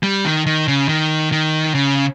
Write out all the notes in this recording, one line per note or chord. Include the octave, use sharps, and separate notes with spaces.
G3
D#3
D#3
C#3
D#3
D#3
C#3